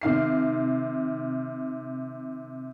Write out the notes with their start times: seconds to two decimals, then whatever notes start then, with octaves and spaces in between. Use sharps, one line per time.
0.02 C3 D#3 F5 C7